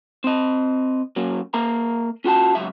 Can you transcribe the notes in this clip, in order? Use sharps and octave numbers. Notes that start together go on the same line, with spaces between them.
C4 D#5
F#3 A#3 C#4
A#3 A#4 E5 A#5
C#4 F4 F#4 F5 A5
C#2 F#2 E5